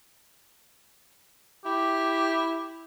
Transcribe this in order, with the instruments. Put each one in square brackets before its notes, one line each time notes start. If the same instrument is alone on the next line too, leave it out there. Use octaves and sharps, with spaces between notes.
[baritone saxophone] E4 [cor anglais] G4